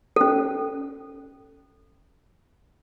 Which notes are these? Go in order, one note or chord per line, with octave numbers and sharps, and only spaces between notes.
C#4 A4